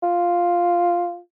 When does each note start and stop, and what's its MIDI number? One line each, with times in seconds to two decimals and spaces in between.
0.03 1.18 65